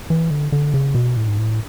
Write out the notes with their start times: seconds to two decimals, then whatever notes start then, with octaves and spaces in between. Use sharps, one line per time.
0.10 E3
0.31 D3
0.52 D3
0.74 C#3
0.95 B2
1.17 A2
1.28 G#2
1.39 A2